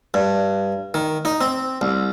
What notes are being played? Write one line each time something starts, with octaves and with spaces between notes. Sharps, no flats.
G2
D#3
D#4
C4
C2